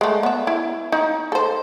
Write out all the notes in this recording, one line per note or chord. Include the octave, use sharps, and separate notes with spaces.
G#3 A3
B3 E5
E4
D#4
A4 C5